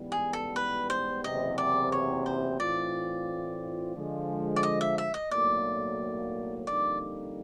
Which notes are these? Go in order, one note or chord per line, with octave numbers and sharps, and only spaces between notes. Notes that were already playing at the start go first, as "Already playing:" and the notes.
Already playing: A1 G#2 E3 G3 B3
G#4
A4
B4
C5
F#1 E2 C3 D#5
D5
C#5
C5
A2 E3 A3 C4 F4 D5
D3 F3 G#3
D5
D#5
E5
E5
D#5
B1 A2 F#3 A#3 D5
F2 D3 G3 A#3 D#4 D5